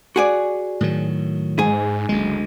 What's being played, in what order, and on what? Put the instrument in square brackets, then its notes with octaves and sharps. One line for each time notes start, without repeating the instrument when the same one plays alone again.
[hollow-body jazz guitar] F#4 G#4 D5
[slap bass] A2 D#3 F#3
[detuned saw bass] G#2 [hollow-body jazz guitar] G#4
[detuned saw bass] F#1 [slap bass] D2 G#3